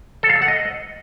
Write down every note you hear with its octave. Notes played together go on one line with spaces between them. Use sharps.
A4
F5
A4
F#5
D#5